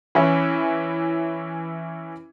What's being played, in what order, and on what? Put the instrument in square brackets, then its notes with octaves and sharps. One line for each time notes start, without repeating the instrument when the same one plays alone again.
[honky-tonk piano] E3 C#4 E4